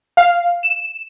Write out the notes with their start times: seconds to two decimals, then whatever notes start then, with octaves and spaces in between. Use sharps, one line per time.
0.17 F5
0.63 E7